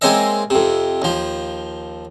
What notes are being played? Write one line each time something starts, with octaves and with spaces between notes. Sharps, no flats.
G#3 A#3 C4 C#5 D#5 E5
F2 C3
D#2 F3